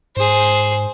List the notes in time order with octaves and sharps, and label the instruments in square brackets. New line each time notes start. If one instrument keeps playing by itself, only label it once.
[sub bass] G#2 [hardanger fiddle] G#4 C5